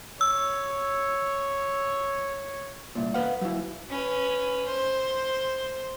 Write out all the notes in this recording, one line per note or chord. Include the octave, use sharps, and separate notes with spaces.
C#5 E6
C2 A#2
B4 F5 F#5
F#3 E4
C#4 B4
C5